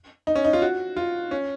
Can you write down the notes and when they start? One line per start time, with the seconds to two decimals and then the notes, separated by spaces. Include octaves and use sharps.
0.27 D#4
0.35 C#4
0.45 D#4
0.53 F4
0.62 F#4
0.96 F4
1.31 C#4